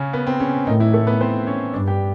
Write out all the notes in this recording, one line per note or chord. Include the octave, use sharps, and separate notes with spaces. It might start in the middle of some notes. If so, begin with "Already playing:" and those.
Already playing: C#3 C#4
B3
C4
C#3 C#4
A2 D#3 D#4
E3 E4
A3 A4
B3 B4
C4 C5
C#4 C#5
G2 D4 D5
G4 G5